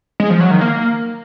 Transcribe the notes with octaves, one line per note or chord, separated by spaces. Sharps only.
G#3
F3
F#3
D#3
A#3